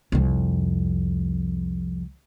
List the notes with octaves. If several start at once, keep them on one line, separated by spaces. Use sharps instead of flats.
C2 F2